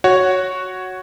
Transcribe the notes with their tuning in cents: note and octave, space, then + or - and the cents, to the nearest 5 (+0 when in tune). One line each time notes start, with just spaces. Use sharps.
F#4 +0 C#5 +0